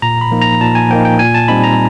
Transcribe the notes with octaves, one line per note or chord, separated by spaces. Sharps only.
A#2 A#5
B5
F3 A#3 D#4
A#5
A#2 A5
G#5
F3 A#3 D#4 G5
G5
A#2 G#5
A5
G3 C4 D#4 B5
A#5